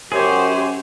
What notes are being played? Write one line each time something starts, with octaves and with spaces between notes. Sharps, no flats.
F#2 G4 G#4 C5 C#5